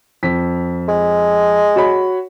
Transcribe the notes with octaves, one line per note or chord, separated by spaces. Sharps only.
F2 B6
G#3
F#4 C#5 B5